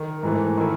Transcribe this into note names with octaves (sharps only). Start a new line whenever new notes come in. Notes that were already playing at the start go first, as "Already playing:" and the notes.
Already playing: D#3
G#2 E3 A3
D#3 A3 E4